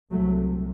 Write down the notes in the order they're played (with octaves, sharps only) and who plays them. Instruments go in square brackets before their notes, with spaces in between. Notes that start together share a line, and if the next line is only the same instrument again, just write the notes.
[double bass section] C2 C3 F#3 A3